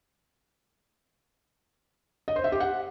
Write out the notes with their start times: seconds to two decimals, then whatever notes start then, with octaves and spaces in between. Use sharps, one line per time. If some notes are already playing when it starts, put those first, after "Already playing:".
2.28 D#5
2.36 C5
2.44 E5
2.52 G4
2.60 F#5